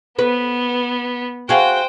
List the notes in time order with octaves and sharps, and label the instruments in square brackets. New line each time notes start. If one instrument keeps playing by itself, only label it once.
[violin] B3 [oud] B4
[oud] F#4 G#4 F5 [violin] C5 G5